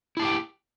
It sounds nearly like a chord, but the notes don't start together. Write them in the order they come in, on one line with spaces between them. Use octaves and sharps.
E4 A5 G4 G5